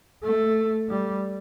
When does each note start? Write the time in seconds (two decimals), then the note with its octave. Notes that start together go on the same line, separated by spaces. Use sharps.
0.23 A3
0.90 G3